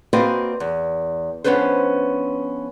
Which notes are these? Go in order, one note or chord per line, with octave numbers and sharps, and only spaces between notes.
A#3 C4 F#4 B4 D5 D#5
E2
F3 B3 C#4 D4 B4 C5